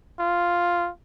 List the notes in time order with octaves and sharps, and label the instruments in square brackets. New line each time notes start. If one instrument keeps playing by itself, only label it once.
[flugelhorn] F4